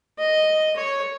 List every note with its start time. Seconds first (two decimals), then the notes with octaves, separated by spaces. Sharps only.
0.18 D#5
0.76 C#5